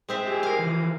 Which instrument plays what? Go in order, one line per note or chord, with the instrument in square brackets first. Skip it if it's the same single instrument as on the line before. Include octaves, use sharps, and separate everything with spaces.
[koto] G#3 C4 E5
[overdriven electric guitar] G4 G#4
[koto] A#4 F5
[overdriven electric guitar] E3 F3